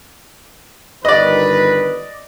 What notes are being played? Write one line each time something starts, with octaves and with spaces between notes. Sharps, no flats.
G1 D#3 B4 D5 D#5